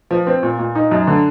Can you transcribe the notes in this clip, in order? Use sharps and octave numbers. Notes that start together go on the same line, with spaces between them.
F3
C4
A#2
A#2
D#4
F#2
D3